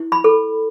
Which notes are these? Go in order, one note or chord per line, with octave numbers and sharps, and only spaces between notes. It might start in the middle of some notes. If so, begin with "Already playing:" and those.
Already playing: E4
B5
A4